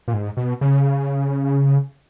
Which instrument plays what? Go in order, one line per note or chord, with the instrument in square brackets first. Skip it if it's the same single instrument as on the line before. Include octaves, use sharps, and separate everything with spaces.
[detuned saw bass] A#2
G#2
B2
C#3